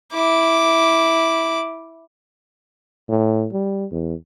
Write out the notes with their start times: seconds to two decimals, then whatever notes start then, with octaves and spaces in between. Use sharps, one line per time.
0.14 E4 D6
3.09 A2
3.53 G3
3.91 E2